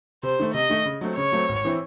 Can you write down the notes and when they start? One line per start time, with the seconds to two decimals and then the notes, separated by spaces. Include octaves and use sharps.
0.23 C3 C5
0.39 D#3 A3
0.54 C3 D#5
0.70 D#3 A3
0.85 C#3
1.01 F#3 A3 C4
1.17 C#3 C#5
1.32 F#3 A3 C4
1.49 G#1
1.65 E3 C4 E4